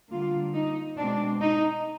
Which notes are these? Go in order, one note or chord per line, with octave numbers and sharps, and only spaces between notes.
D3 G3 A#3 F4
D#4
B2 G#3 C4 D4
D#4